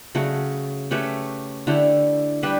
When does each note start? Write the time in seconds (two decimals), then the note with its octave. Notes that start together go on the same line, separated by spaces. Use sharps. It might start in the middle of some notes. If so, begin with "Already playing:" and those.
0.15 C#3 F#3 A3
0.91 A3 C#4 G4 B4
1.67 D3 A3 E4 G4
2.43 G3 D4 G4 B4